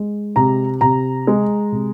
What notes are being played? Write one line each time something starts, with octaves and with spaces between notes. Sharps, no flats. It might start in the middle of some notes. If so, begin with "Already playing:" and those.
Already playing: G#3
C3 A#5
C3 A#5
G#3
C3